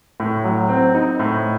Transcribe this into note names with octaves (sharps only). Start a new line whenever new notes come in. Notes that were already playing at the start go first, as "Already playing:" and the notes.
A2
F#3
C4
D#4
A2